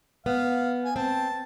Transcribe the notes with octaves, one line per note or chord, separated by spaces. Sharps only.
B3 F5
G#5
C4 A5